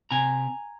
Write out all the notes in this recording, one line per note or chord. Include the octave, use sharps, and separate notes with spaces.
C3 G#5 A#5